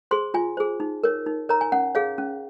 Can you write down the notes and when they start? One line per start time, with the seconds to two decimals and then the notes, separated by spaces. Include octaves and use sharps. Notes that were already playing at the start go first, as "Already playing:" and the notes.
0.11 G#4 C5 C6
0.34 F4 G#5
0.57 G#4 C5
0.80 D#4
1.04 A#4 C#5
1.26 D#4
1.49 A#4 C#5 A#5
1.61 G#5
1.72 C#4 F#5
1.95 G#4 C#5 F5
2.18 C#4